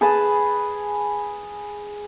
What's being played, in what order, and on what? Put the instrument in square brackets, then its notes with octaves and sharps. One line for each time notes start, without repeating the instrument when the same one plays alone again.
[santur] G#4 B4 A5